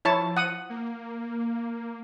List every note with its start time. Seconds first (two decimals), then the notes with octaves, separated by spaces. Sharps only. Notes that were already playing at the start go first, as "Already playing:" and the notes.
0.05 F3 E4 C#5 A5
0.37 F#5 D#6
0.70 A#3